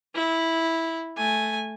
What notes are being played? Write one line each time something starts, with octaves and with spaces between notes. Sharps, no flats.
E4
A3 G#5